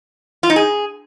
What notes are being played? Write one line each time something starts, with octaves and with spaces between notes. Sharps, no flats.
F4
D#4
G#4